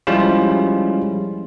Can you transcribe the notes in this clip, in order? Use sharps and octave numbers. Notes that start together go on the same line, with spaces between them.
F3 G3 G#3 C#4 E4 F4